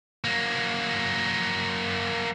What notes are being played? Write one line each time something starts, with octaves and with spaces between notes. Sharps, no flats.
F#3 A#3